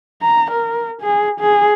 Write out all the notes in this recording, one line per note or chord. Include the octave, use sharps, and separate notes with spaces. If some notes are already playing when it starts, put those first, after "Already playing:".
A#5
A#4
G#4
G#4